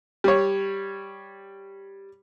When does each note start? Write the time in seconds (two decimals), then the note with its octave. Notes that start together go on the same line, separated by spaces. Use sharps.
0.24 G3 C#5